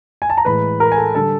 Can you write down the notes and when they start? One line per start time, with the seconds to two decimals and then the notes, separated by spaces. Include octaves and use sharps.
0.22 G#5
0.30 A5
0.37 A#5
0.45 A2 E3 G#3 B4 B5
0.80 A#4 A#5
0.92 G#5
0.97 A4 A5
1.14 D3 G3 A4 A5